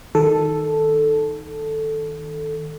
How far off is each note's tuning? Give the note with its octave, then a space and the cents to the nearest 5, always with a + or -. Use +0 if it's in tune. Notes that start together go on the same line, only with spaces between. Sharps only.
D#3 +0 A4 +0